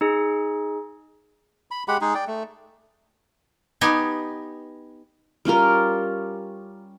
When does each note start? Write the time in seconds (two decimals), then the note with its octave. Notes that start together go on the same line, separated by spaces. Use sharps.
0.01 D#4 G#4
1.71 B5
1.88 G#3 G4 F#5 B5
2.01 G#3 D#4 G#4
2.15 D5 G5
2.27 A3
3.81 B3 D#4 G4 G#5
5.45 G3 C#4 F4 A#4